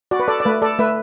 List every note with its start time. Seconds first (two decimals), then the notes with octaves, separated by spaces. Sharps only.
0.11 F#4 D5
0.20 B4
0.28 A4 D5
0.40 D5
0.45 A3 B4
0.62 A4 D5
0.79 A3 B4 E5